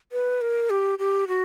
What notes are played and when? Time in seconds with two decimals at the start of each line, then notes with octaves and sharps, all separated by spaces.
0.12 B4
0.41 A#4
0.70 G4
0.99 G4
1.28 F#4